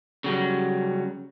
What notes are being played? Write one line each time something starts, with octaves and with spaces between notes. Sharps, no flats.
C#3 F#3 G3